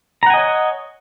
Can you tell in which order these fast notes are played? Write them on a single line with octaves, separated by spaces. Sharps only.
A#5 F#5 G#5 D#5 C#5